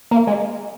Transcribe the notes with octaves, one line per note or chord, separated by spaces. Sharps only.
A#3
G#3